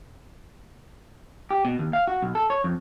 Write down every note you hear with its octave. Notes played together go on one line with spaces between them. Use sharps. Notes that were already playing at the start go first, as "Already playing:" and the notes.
G4
B2
D#2
F5
F#4
B1
A4
C#5
F2